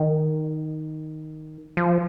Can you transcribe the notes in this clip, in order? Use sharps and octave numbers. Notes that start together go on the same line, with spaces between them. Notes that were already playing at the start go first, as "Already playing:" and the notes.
Already playing: D#3
F3